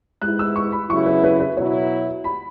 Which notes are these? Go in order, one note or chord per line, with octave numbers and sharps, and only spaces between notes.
G#2 G#3 B3 E4 F#6
E6
C#6
B5
C#3 F#3 B3 E4 C#6
B4
B4
B4
B2 F#3 E4 C#5
B5